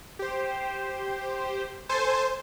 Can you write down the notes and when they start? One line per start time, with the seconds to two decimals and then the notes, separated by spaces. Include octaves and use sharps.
0.19 G4 C5
1.89 A4 C5 G#5 A5